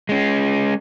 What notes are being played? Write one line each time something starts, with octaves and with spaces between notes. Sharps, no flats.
G#3 C#4